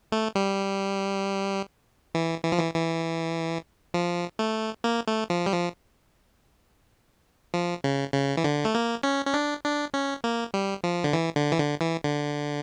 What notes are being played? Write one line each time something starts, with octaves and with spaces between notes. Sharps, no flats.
A3
G3
E3
E3
F3
E3
E3
F3
A3
A#3
A3
F3
G3
F3
F3
C#3
C#3
E3
D3
A3
A#3
C#4
C#4
D4
D4
C#4
A#3
G3
F3
D3
E3
D3
E3
D3
E3
D3